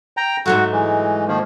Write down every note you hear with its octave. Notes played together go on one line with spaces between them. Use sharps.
G5 A#5
G#2 F#3 A3 F#4
E3 G#3
D#3 F3 A#3